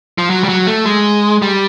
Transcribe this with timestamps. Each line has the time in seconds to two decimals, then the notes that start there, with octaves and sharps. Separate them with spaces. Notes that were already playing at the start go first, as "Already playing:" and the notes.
0.18 F3
0.30 F#3
0.44 G3
0.49 F#3
0.67 A3
0.86 G#3
1.42 G3